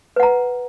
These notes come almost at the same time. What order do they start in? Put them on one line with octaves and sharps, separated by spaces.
B4 F#5 A#5